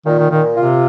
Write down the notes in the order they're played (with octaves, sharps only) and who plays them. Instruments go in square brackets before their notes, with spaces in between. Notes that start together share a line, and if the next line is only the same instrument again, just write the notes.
[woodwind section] A#2 [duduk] D#3
[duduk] D#3
[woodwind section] A#2 [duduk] D#3
[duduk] C3 [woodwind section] F4